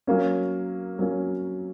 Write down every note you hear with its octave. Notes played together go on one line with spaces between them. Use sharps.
F#3 A#3 C#4
F#3 A#3 C#4